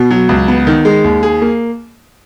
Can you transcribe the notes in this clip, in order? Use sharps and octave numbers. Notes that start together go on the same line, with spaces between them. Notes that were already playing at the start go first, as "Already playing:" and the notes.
Already playing: B2
F#3
C#2
B3
D#3
G#3
D#2
G#4
A#3